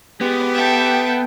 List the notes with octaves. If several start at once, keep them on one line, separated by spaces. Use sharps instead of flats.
G#3 B3 G4
A4 E5 G5